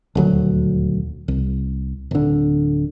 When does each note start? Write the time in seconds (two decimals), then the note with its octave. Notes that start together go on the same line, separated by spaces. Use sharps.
0.15 D#1 D2 F#3
1.28 C2
2.11 D1 D3